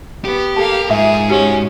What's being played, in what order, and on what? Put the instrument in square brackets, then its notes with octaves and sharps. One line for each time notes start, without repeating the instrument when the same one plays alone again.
[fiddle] B3 [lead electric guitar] G4
[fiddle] A#3 F5 [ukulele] A4 A#4 A5
[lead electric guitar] G#2 [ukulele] F4 E5 [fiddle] G#4
[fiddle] C#4 [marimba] F#4 G4 F#5